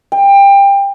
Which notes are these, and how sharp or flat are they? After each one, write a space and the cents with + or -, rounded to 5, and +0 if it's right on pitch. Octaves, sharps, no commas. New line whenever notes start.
G5 +25